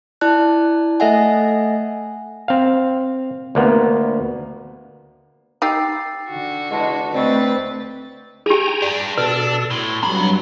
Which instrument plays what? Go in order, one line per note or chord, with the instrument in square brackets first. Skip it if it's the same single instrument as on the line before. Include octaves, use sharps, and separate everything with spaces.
[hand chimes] E4 D5 A5 F#6
A3 A4 D#5 E5 F#5 G#5
[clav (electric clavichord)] C4 F5
D2 A#3 B3
[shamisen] D#4 G4 [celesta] E6 A6 C7
[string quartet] D3 F#4
[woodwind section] E2 G#3 [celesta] D#5 A5
[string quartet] D2 B4 A6 [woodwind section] C4 [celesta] D5 D#5 C#6
[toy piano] G4 G#4 [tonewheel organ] G5 G#5 A#5
[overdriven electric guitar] G3 D4
[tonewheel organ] B2 A4 [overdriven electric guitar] D4 [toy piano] B4
[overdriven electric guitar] A2 [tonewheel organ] C6
[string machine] G2 F#3 [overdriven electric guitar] C4 B5 [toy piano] A#5